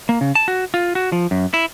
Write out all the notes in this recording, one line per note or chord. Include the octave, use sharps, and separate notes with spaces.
A#3
C#3
A5
F#4
F4
F#4
F3
F#2
E4